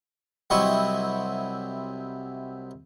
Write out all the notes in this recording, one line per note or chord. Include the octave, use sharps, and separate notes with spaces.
C2 F#3 C4 E4 D#5 C#6